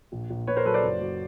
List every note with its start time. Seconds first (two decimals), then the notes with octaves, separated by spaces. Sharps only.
0.12 A#1
0.30 A#1
0.47 A#2 B4 C#5
0.56 A#4 C5
0.65 F#3 A4 B4
0.74 C5 D5
0.83 F#1
1.01 F#3